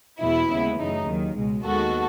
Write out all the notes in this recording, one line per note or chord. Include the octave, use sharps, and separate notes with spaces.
E2 B2 G#3 B3 E4
D#2 C#3 G#3 B3
F#2 C#3 E3 A3 D#4
D#2 D#3 F#3
C#2 B2 G#3
D#2 D#3 G#3 B3 F#4 A4